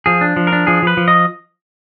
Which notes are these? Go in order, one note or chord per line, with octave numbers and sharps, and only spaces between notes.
F3 G#4
D4
F3
A#4
D4
F3 G#4
F3 B4
F3
D#5